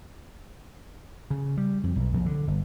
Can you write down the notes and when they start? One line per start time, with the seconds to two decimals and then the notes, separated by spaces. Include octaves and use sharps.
1.30 C#3
1.57 G3
1.84 F2
1.96 B1
2.13 A#1
2.26 D3
2.48 G1